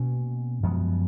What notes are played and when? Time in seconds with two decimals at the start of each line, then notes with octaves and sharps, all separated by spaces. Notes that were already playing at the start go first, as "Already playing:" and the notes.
Already playing: B2 A#3 C#4
0.63 F#2 F3 G#3 B3